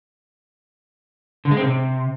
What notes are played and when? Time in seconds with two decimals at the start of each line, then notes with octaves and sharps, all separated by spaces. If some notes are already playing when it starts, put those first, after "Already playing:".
1.45 D3
1.51 G#3
1.57 C4
1.63 C3